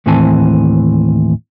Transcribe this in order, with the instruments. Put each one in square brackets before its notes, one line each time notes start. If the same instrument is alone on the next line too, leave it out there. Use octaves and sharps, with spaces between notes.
[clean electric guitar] D#2 A2 E3 C4 G#5 A5